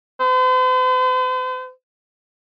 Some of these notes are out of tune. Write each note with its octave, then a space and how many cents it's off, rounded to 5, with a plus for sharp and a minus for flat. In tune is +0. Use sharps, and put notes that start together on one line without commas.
C5 -45